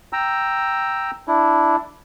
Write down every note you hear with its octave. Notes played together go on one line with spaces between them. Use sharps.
G5 A#5 E6
D4 E4